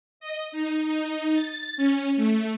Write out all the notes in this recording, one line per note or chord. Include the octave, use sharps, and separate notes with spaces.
D#5
D#4
D#4
A6
C#4
A3